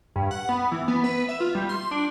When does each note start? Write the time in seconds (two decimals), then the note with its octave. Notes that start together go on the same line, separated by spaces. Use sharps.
0.16 G2
0.31 F#5
0.49 B3
0.72 E3
0.88 B3
1.04 B4
1.29 E5
1.40 F4
1.55 G3
1.69 C6
1.91 D4